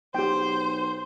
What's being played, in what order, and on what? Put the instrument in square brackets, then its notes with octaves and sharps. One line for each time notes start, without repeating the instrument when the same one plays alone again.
[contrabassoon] B1 [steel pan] G4 G5 [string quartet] C5